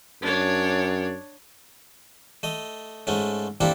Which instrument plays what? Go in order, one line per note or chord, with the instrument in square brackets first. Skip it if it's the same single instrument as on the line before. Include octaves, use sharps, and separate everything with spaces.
[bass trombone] F#2 [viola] D4 C#5
[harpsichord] A3 D#5
G#2 G#3 A3 C#4
A#3 C4 D4 E4 G4 A4